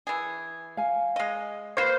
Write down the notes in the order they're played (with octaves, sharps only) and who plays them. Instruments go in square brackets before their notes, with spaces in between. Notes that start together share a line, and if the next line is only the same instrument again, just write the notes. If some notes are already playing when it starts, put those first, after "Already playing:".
[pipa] E3 G#4
[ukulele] F5 G#5
[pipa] G#3 D#5
[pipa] A#3 F4 B4 [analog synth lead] C5